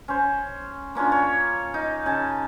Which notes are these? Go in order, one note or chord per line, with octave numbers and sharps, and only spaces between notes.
C#4 C5
A#3 C#4 D4 F4
C#5
D#4
C#3 G#5 A5